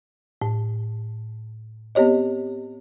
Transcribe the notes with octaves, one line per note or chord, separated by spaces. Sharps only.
A2
B3 C4 G4 C#5 D#5